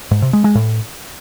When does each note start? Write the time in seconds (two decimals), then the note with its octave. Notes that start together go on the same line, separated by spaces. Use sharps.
0.11 G#2
0.22 C3
0.33 G#3
0.44 G#3
0.55 A2